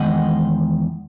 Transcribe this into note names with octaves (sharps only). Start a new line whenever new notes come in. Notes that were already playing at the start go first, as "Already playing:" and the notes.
Already playing: E2 D#3 G#3 D#5 F#5